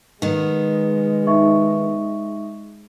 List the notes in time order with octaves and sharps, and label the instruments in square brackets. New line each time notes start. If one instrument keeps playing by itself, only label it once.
[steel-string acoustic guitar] D#3 B3 [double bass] G#3
[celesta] D#4 E5 C#6